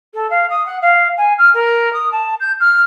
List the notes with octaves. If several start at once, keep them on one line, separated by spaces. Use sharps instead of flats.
A4
F5
D#6
F#5
F5
G#5
F6
A#4
D#6
A5
G6
F6